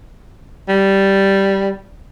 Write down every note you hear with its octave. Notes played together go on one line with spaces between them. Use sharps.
G3